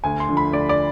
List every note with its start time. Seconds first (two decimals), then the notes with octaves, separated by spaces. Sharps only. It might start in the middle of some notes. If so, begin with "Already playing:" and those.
0.04 D2 G#5
0.20 C6
0.29 D3 F3
0.37 B5
0.52 D2 D5
0.69 D5